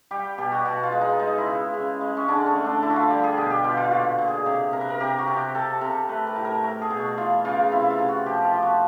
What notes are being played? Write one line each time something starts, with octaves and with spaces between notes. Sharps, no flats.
G3 G4
B2 G4
F#4
B2 F#4
F4
G#3
D#4
G#3 D#4
E4
C#3
C#3
G#3
C#4
D3 D4
C#4
A3
D4
D3 E4
F#4
F4
G3 G4
G#4
B2 G4
G4
B2 F4
F4
A#2 F#4
A#2
G#4
C3 G4
C3 A#4
B4
A#4
C3 G4
F#4
C3
G4
C3 A4
C3 A#4
A3 B4
A#4
A2
A#4
A3 A#4
G#4
B2
F#4
E3 F4
C#3 F4
C3 E4
F4
C3
F#4
F3 G4
F4
F3
F#4